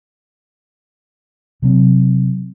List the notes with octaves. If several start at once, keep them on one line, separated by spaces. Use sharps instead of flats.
C3 F#3 C4